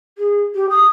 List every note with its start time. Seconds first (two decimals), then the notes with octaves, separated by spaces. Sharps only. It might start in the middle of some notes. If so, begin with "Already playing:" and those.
0.18 G#4
0.54 G4
0.70 D#6